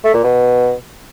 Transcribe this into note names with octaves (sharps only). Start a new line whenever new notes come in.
A3
A#2
B2